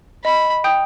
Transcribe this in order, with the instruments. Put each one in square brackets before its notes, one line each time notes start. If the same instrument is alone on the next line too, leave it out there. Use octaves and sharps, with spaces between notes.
[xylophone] D#5 [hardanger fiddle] B5
[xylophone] G5 D#6 G6